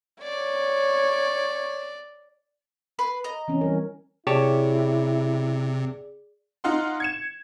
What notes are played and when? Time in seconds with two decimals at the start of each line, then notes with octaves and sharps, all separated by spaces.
0.23 C#5 D5
2.99 B4 B5 C6
3.24 D#5 A#5
3.48 E3 C4 C#4
3.61 E3 G3 A#4
4.27 C3 E4 G4 G#4 C#5 D5 A5
6.64 D#4 F4 F#5 C6
7.00 G#6 C#7 E7